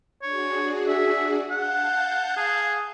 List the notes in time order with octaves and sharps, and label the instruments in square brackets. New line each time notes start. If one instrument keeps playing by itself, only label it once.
[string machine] D4 F#4 G#4 [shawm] C#5
[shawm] E5
[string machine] F5 A5 G6 [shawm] F#5
[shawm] G#4